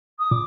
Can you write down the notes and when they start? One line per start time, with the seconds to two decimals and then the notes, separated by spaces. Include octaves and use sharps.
0.19 D#6
0.31 A#2 D6